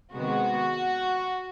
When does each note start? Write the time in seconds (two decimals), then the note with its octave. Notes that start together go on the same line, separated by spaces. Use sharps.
0.15 C3 D#3 G#3 B3 F#4